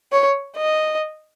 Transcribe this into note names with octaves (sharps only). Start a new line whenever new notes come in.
C#5
D#5